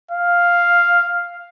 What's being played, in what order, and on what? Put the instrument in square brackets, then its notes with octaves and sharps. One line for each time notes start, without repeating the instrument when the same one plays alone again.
[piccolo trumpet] F5